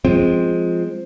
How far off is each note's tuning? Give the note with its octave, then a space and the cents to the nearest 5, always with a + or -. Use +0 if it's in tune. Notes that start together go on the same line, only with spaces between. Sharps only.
F3 +0 G#3 +0 C4 +0